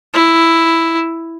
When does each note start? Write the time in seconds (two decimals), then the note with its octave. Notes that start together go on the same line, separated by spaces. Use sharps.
0.14 E4